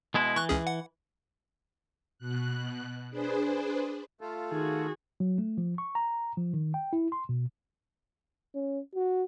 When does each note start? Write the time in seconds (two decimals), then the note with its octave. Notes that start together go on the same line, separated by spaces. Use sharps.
0.14 B2 G#3 E4
0.36 E3 C#6 F#6
0.49 C#2 C#4 G#4
0.67 F#5
2.18 B2 F#6
3.10 D4 G#4 B4 C5
4.21 A3 F4 A4
4.51 D#3 F#4 G#4
5.20 F#3
5.38 A3
5.58 F3
5.78 C#6
5.95 A#5
6.37 F3
6.54 D#3
6.74 G5
6.93 E4
7.12 C6
7.29 B2
8.55 C#4
8.95 F#4